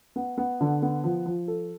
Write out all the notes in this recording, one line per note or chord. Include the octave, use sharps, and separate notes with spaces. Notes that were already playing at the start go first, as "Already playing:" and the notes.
B3
B3
D3
B3
F3
F3
A4